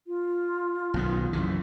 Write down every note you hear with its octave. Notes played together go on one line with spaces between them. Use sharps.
F4
B1 B2 D#3
F#2 C#3 E3